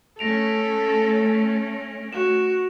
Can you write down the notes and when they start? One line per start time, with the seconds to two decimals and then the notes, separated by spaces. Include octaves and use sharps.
0.19 A3 C#4 A4 A#6 D7 F7
2.13 F#4 E7